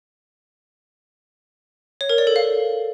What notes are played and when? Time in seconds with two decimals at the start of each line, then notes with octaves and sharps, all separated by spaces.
2.01 C#5
2.09 A#4
2.18 D5
2.27 A4
2.36 F5